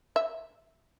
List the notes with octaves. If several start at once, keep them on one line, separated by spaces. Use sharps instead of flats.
E5